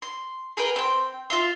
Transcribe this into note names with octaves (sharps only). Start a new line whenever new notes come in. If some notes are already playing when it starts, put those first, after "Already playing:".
C6
G#4 A#4 B4 G5
C4 G5
F4 E5 C6